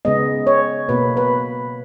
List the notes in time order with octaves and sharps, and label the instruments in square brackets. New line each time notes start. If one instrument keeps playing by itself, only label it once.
[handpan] C#3 G#3 B3 D#5
C#5
B2 A#3 B4
B4